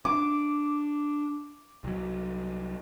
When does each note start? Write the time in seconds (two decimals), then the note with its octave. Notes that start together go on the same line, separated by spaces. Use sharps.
0.05 C#4 D4 D6
1.84 C2 F#3